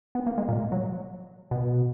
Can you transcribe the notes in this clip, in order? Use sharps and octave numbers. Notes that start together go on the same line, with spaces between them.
B3
A#3
G#3
A#2
F#3
B2